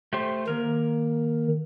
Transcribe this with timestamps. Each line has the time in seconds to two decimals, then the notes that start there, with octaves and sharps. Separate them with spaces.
0.13 A3 G4 C5
0.48 D#3 A#3 A#4